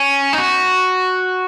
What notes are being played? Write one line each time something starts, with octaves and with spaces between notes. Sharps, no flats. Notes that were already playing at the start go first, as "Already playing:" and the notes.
Already playing: C#4
D#4
F#4